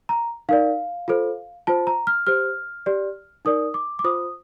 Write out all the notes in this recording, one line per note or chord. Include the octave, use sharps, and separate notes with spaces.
A#5
D#4 A#4 D5 F5
F4 A4 C5
F4 C5 A5
A#5
F6
G4 C5 F6
G4 D5
D#4 A#4 D5 D#6
D6
D6
F4 C5 D#6